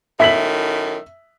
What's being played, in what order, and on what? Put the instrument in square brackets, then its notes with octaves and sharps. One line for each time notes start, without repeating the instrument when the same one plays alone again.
[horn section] F#2 A2 D#3 [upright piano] E5 B6 F#7